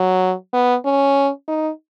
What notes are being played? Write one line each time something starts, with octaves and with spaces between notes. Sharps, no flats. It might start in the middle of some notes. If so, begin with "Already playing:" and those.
Already playing: F#3
B3
C#4
D#4